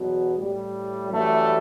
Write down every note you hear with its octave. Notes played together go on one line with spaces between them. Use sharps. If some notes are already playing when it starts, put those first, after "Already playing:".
Already playing: E2 B2 F#3
A2 G3
F#2 E3 G3 A3